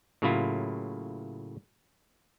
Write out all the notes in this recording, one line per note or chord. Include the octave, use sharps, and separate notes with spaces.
A2 C#3 F#3 A#3 E4 F4